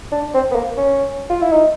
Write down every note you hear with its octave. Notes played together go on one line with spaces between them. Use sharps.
D4
C4
B3
A#3
C#4
F4
E4
D#4